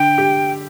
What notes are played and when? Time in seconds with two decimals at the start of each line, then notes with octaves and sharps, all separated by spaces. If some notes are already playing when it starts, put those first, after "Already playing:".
Already playing: D3 G5
0.18 G4